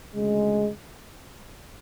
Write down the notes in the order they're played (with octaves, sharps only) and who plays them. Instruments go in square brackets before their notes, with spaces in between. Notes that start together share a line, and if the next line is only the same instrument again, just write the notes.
[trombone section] D2 C#3 G#3